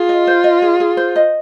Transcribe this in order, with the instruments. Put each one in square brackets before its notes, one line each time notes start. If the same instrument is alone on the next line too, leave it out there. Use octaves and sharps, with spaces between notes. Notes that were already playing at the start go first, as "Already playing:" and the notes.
Already playing: [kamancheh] F4 [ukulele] G#4
[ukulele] D#5
C5
D#5
G#4
G#4
C5
D#5